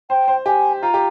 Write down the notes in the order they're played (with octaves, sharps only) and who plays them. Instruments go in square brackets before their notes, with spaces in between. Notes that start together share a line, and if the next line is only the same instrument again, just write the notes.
[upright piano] C5 [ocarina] G5
[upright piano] C5
[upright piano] G4 [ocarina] G#5
[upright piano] F4 [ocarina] A#5
[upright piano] G4